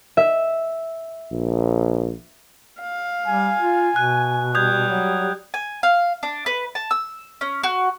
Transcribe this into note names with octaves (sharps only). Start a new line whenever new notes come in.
E5
A#1
F5
G3 G#5
F4
B2 F#6
G3 D#6 G6 G#6
F#3
G#5
F5
D4
B4
A5
E6
C#4
F#4